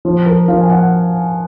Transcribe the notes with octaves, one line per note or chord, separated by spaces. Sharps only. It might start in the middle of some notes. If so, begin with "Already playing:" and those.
F3
A#4
F3 F5
G#5
F#5